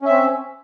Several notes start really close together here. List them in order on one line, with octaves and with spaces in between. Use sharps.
C#4 E5 C4